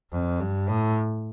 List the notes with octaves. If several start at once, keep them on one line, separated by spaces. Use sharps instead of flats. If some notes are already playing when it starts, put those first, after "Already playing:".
F2
G2
A2